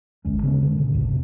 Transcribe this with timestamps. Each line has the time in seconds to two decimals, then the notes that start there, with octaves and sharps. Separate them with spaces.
0.25 G1 D2 G#3 C#4
0.43 C#3 G#3 B3 C#4
0.62 F1 D3 D#3 G#3
0.76 A#2 C#3
0.93 G#1 D2 A2 C#3
1.08 E1 C3